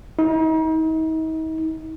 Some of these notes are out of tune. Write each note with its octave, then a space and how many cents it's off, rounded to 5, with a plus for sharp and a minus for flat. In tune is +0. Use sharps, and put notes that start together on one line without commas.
D#4 +40